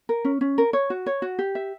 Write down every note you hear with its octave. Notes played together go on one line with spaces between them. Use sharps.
A#4
C#4
C#4
A#4
C#5
F#4
C#5
F#4
G4
E5